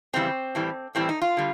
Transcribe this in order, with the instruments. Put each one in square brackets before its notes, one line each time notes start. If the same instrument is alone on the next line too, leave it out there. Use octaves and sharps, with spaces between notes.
[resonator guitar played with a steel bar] F2 C#3 E3 G3 C4
A2 E3 G3
A2 E3 G3 C4
D#4
F4
D3 G3